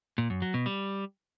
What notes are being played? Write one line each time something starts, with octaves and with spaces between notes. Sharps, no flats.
A#2
F#2
F#3
B2
G3